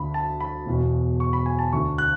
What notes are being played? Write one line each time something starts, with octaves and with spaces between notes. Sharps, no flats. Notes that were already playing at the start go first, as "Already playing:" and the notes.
Already playing: D2 D3 B5
A5
B5
E1 E2 B2
C#6
B5
G#5
A5
D2 D3 C#6
F#6